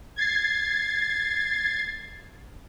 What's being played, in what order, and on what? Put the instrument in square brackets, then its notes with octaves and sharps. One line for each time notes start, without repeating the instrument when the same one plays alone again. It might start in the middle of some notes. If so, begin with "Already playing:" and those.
[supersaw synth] G#6 A6 C7